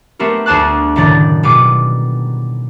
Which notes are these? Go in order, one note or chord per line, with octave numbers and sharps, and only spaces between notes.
A3 B3 C4 G4 A#4
D2 G#4 C5 A5 D6 F#6
F#1 A2 D3 D#3 D5 A6
B2 G3 B3 G#4 D6